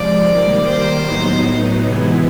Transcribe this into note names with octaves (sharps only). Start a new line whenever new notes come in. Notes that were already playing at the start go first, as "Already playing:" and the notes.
Already playing: C3 F3 G#3 D5
D#3 G3 A#3
C5
A2 F#3 B3 D#4
C3 E3 G#3 B3 E4